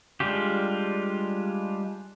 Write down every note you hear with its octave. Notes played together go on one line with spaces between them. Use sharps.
G3 G#3 D4 F4 G4